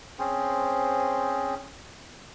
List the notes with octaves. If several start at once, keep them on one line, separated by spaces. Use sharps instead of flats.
C4 C#4 G#4 C5